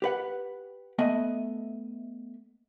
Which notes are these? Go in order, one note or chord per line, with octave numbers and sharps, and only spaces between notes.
G4 B4 F#5
A3 B3 D#5 E5